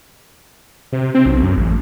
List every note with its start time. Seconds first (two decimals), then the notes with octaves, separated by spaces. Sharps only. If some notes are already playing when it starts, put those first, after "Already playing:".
0.93 C3
1.14 C4
1.26 B1
1.43 F#2
1.57 A1